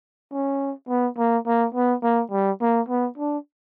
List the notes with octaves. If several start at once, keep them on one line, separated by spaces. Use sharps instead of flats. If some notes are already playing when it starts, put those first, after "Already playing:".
C#4
B3
A#3
A#3
B3
A#3
G3
A#3
B3
D4